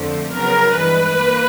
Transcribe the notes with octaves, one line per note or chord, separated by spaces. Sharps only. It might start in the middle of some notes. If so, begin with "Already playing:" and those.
Already playing: F2 D3 F3 A3 C4
C#3 F#3 B3 A#4
G2 E3 G#3 B4
A#3